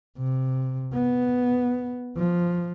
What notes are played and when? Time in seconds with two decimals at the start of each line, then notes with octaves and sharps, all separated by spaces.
0.18 C3
0.93 B3
2.17 F3